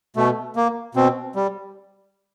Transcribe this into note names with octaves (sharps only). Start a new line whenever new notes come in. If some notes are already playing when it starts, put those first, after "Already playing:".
B2 A3
A#3
B2 C4
G3